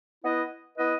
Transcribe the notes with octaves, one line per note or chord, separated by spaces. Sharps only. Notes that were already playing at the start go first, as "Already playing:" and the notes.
B3 E4 B4 D#5
B3 E4 B4 D#5